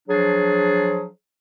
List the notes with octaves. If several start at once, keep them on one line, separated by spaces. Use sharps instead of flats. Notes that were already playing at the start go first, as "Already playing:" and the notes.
F3 F#3 D4 G#4